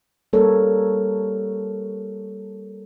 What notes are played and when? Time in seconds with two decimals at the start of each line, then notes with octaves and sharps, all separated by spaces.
0.33 G3 A#3 A4 A#4 C#5